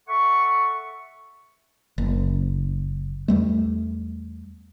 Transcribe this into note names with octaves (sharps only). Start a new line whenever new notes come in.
A4 E5 F#5 C#6
F#1
E2 G3 A3